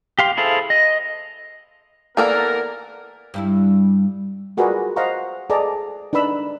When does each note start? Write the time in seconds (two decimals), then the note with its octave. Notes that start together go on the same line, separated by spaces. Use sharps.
0.19 G4 F5 C6
0.37 E4 G#4 A4 C5 F5
0.70 D#5
2.17 E3 A#3 B3 A4 A#4 D5
3.34 G2 G3 E4
4.57 F4 F#4 G#4 A#4 B4 D5
4.96 C5 D#5 F5 F#5 A#5 C#6
5.50 G#4 A4 B4 D5 D#5 A#5
6.13 D4 D#4 B4 B5 E6